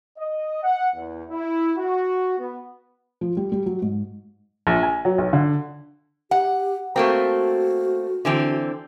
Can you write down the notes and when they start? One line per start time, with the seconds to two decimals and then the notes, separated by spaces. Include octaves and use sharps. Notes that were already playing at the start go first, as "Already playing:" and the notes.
0.17 D#5
0.63 F#5
0.95 E2
1.30 E4
1.77 F#4
2.38 B3
3.21 F3
3.37 G3
3.52 G3
3.66 F#3
3.82 G#2
4.67 A#1
4.83 G#5
5.05 F#3
5.18 B1
5.33 D3
6.31 G4 F#5
6.96 A3 A#3 C4 F#4
8.25 D3 E3 C4